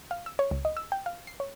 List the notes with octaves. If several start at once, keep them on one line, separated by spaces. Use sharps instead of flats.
F5
E6
C#5
C#2
D#5
E6
G5
F5
C7
C#5